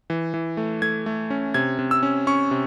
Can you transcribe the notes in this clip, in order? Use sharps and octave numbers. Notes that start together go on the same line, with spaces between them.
E3
E3
A3
A3 G#6
A3
C#4
C3 G#6
C3
E6
C#4
C#4 C#6
C3